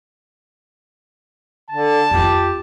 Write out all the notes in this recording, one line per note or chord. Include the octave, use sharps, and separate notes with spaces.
D3 A5
F2 F4 G4